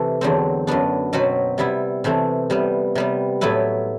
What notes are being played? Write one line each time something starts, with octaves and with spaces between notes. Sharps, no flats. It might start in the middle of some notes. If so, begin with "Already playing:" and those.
Already playing: C3 E3 A3
E2 D3 F#3 C4
F#2 F#3 B3 D4
B2 F#3 C4 F#4 B4
C3 G3 B3 E4
C3 E3 A3 C4
C3 G3 B3
C3 G3 B3
A2 F#3 B3 E4 B4